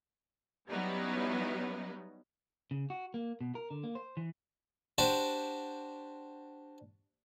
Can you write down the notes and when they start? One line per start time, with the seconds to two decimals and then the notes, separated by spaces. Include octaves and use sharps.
0.70 F#3 G3 B3 C#4 D#4 E4
2.71 C#3
2.90 F#4
3.14 A#3
3.41 B2
3.55 A#4
3.71 D3
3.84 A#3
3.95 C5
4.17 E3
4.98 D4 F#4 G4 C5 D5